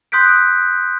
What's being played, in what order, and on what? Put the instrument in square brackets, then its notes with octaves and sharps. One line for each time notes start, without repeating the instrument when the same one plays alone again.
[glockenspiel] C6 D#6 F#6 G6 B6 D7